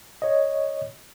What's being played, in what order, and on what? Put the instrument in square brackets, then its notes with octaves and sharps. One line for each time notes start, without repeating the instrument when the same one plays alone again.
[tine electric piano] C#5 D#5